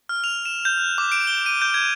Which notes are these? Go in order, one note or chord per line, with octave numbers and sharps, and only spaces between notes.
F6
F7
E7
G6
F#6
D6
D7
G7
D#7
G6
G#6